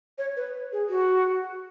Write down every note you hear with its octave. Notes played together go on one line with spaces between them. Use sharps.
C#5
B4
G#4
F#4